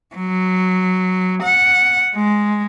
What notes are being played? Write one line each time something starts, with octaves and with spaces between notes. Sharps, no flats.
F#3
F#5
G#3